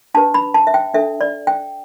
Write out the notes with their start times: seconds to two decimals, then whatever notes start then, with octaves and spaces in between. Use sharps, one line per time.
0.14 D4 G4 B4 A5
0.34 B5
0.54 A5
0.67 E5
0.74 G5
0.94 D4 A4 E5
1.21 D5
1.47 G5